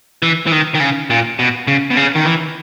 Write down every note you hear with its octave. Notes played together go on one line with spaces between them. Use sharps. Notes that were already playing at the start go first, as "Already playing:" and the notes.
E3
E3
D#3
D#3
C#3
A#2
B2
C#3
B2
C#3
D#3
E3